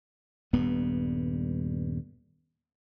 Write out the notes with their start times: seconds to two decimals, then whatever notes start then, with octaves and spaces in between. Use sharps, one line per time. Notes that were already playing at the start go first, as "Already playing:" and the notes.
0.53 D#1 G2 B3